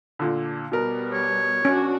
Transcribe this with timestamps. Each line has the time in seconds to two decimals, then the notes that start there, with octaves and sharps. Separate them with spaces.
0.19 A#2 D3
0.72 B2 G3 B3 A#4
1.13 C#5
1.65 C#4 D4 F#4